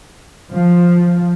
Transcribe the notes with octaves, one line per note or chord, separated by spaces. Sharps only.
F3